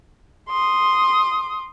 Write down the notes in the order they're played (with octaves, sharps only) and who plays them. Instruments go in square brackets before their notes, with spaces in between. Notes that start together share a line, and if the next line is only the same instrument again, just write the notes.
[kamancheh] C6 D#6